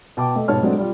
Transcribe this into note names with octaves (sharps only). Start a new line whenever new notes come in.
B2 G5 A5 D6
A3 D#5
G#2 B2 G#3 C#5 A5 F6
F#3 G#3 A3 C4 D4 F#4
G3 F4